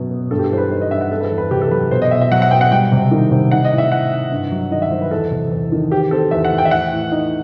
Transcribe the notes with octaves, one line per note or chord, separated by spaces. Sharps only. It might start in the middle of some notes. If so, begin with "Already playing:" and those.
Already playing: F#2 B2 F#3 B3
B3
G2 A4
G4
A4
E3 C5
B4
D#4 C5
D#5
G2 E5
F#5
C4 A4
B4
A4
E2
B4
C3 G4
A4
F#3 B4
B2 C5
D#5
B2 E5
E5
F#3 F#5
F#5
B2 G5
F#5
G3 G5
C3
D#3
C3
D#4 F#5
D#5
A2
E5
D#4 F#5
D#4
G2
F#3
D#3 D#5
E5
F#3 C5
B4
E2 A4
C3
E2
D#3
C4 G4
C4 A4
E2 E5
F#5
E2
G5
E5
A2 F#5
A2
D#4